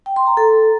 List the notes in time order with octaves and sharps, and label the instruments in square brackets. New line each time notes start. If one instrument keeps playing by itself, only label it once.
[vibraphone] G5
C6
A#5
A4